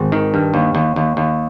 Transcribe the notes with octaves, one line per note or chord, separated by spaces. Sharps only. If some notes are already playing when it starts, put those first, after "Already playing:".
Already playing: G#1
D#3
G2
D#2
D#2
D#2
D#2